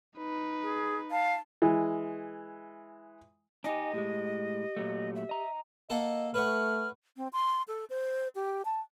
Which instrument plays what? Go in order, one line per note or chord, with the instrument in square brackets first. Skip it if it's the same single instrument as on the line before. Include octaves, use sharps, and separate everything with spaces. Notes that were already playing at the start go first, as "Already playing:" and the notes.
[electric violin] D#4 B4
[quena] G#4
[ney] F5 [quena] A5
[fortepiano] E3 G#3
[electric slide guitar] D4 D#4 G4 [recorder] D#5 [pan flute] G#5
[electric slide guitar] A2 G#3 [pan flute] G4
[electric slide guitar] A#2 F#3 A3
[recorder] E5
[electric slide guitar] D#5 A#5
[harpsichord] A#3 A4 F#5 [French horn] D#5
[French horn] A3 [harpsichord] B4 C#5 F#5 [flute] F6
[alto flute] C4
C6
A4
C5
G4
A5